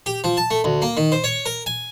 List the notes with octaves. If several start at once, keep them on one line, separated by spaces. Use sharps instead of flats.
G4
F3
A5
A3
D2
A#3
D#3
C5
C#5
A#4
G#5